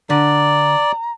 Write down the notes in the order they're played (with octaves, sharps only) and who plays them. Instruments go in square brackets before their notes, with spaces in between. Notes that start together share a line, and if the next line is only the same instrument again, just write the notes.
[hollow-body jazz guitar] D3 [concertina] D5 [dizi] A#5